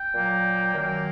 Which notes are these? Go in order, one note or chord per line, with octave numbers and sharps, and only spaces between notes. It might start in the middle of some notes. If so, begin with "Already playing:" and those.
Already playing: G5
A#2 F#3 A#3
F#2 D#3 F#3 A#3